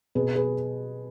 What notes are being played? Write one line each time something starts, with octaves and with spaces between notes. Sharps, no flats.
B2 G#4 B4
G#4 B4